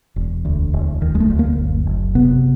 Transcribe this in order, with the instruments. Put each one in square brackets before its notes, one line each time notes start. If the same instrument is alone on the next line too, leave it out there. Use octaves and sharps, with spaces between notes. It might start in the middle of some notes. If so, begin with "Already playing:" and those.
[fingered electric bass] E1
D2
E1
D2 D#3
G#3
A3
D2
A#3
F#1
F#1
C3 B3